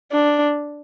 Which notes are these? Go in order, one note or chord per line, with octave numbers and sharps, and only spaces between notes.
D4